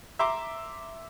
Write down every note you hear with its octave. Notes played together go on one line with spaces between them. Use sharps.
E5 A#5 C6 D6